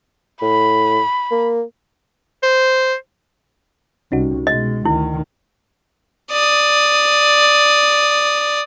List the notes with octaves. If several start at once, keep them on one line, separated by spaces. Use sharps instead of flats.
A2 B5
A#3
C5
C2 C#4 D#4 F#4
B2 G#3 D#5
D2 D#3 E4
D5 D#6